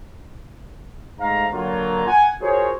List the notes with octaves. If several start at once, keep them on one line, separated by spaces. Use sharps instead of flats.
G#2 A3 F5 A#5
D3 F#3 A#3 F4
F#5 G#5
F4 F#4 G#4 A#4 C5 C#5